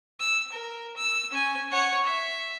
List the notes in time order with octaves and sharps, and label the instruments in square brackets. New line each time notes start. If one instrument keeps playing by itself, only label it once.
[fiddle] E6
A#4
E6
C#4 G#5
C#5 F#5
E5